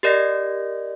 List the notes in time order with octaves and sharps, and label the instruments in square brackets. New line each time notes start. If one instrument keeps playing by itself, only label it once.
[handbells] G4 A#4 D5 D#5 A#6